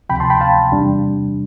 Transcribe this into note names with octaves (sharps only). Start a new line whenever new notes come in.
D2 C3 F3 G5 B5
A5 C6
G5 B5
F5 A5
E2 C3 G3 D4